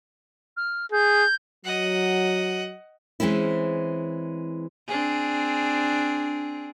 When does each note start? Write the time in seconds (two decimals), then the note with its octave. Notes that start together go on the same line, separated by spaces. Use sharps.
0.57 F6
0.92 G#4 G6
1.65 F#3 D#5 F#5
3.20 E3 G#3 C4 C#4 E4
4.87 C4 D4 G#4